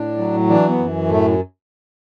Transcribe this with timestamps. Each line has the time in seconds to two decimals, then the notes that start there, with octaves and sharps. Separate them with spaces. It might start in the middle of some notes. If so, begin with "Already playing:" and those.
Already playing: A2 D4
0.18 F#3
0.48 E3 D4
0.68 B3
0.78 F#2
1.08 A2 A3